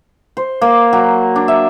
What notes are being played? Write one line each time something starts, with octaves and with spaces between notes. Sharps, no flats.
C5
A#3
F#3
D4
E5